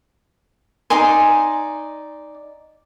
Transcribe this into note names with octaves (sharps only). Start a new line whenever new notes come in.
D#4 D5 G#5 C6